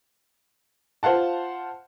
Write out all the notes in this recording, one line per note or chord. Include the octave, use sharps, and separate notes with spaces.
F4 C5 F5 F#5 A5